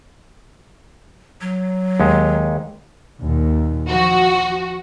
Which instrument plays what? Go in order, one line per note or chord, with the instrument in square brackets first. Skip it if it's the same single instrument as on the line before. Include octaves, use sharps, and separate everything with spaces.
[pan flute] F#3
[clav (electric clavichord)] D#2 G#3
[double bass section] D#2 A#2
[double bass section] F3 [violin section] F#4